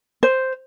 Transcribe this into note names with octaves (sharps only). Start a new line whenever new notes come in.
C5